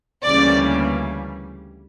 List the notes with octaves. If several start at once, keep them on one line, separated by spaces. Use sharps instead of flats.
D2 C#3 E3 G3 A#3 D5